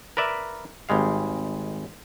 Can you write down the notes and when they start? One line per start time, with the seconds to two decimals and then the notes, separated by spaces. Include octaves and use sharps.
0.17 A#4 B4 D5 E5
0.89 G#1 G3 G#3 F5